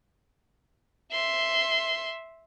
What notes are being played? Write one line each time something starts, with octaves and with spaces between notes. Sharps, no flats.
E5 C6